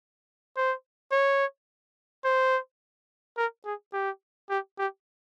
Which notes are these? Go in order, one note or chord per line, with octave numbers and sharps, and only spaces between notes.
C5
C#5
C5
A#4
G#4
G4
G4
G4